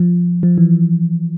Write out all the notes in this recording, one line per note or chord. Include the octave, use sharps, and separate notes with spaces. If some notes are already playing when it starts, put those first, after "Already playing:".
Already playing: F3
F3
E3